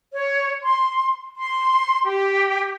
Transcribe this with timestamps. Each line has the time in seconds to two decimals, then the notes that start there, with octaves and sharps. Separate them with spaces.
0.11 C#5
0.62 C6
1.36 C6
2.05 G4